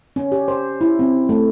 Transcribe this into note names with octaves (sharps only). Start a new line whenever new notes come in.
C#4
G4
C5
E4
C4
A3